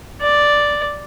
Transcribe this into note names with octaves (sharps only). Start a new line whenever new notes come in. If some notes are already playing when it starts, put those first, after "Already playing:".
D5